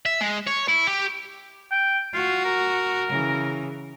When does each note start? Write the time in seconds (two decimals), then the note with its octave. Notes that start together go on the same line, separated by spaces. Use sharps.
0.06 E5
0.21 G#3
0.47 C#5
0.69 E4
0.87 G4
1.72 G5
2.14 F4 F#4
2.45 A#4
3.09 C#3 E3